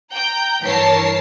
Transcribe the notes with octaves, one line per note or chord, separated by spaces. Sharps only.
G5 A#5 G6
G2 E3 A#4 C#5 A5 C7